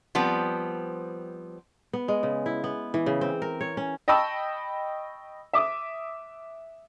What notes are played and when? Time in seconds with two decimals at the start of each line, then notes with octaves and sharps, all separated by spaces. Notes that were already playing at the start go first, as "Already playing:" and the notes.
0.15 F3 G3 B3 C4
1.93 B3
2.08 G#3
2.23 C#3
2.46 E4
2.64 B3
2.94 E3
3.06 C#3
3.21 C4
3.42 A#4
3.61 C#5
3.77 C#4
4.08 D#5 G5 A5 B5 C#6 E6
5.53 E5 D6 D#6